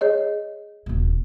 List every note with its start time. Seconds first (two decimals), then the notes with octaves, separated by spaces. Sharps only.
0.01 G#4 C#5 D#5
0.86 D#1 B2